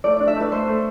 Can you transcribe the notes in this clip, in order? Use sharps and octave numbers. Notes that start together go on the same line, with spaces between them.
A3 D5
D4 D5
E5
A3 B4
A3 C5
A3